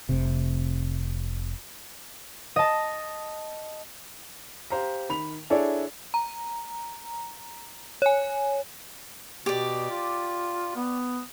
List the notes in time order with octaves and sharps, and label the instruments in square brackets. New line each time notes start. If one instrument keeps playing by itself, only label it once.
[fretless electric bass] F1 C3
[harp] D#5 A5
[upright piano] G4 C5 F5 A#5
D#3 B5 F7
D4 E4 G#4 A4 C#5 D5
[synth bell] A#5
C#5 G#5
[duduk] B2 [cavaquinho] G4 D5
[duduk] F4
B3